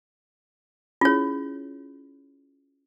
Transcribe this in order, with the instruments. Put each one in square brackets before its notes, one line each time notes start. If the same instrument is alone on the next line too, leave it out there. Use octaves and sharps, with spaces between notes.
[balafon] C#4 E4 G#4 [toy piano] F4 C#5